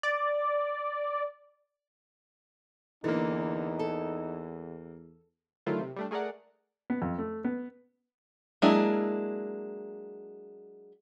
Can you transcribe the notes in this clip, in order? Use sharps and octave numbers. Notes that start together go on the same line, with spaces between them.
D5
E2 D3 E3 A#3 D#4
A4
D3 D#3 F#3 A3 E4 F4
C3
G3 A3 D4
A3 G#4 A#4 D5 F#5
B3
F2
A3
B3
F#3 G#3 A#3 D4 E4